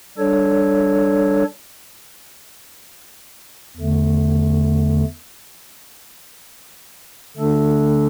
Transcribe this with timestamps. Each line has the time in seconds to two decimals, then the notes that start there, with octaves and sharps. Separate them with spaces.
0.18 G3 D4 A4 C#5
3.77 E2 D3 A3
7.37 D3 A3 D4 A4